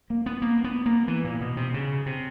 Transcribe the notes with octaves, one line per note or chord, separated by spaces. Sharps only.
A#3
B3
A#3
B3
A#3
E3
A#2
B2
C3
C#3
C3